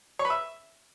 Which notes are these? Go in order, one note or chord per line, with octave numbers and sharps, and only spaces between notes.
C#5
B4
E5